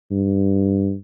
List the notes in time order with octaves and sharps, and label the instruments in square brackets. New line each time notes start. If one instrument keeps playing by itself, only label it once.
[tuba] G2